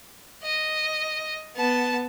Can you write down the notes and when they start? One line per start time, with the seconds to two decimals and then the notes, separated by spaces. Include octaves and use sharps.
0.43 D#5
1.56 B3 A5